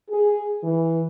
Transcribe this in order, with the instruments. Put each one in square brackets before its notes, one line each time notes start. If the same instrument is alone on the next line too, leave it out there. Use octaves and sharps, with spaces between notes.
[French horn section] G#4
E3